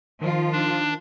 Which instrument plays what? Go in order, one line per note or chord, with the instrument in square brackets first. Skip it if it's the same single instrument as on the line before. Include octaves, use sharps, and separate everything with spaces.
[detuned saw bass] D#3 [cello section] F3 F4
[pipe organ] D4